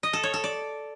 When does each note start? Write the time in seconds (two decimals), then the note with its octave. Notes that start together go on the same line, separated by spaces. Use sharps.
0.03 D#5
0.13 A4
0.23 C#5
0.34 A4
0.44 D5